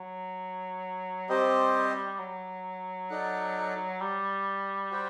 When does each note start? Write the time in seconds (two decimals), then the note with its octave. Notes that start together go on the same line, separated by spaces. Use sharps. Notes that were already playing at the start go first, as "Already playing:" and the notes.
Already playing: F#3
1.29 G3 C4 G4 C5 D#5
2.19 F#3
3.10 D#4 A4 D5 F#5
4.01 G3
4.91 F#4 C5 G5